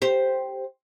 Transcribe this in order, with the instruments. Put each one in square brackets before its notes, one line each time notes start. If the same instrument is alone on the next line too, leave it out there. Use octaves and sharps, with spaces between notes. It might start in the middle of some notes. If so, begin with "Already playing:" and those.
[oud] G4 C5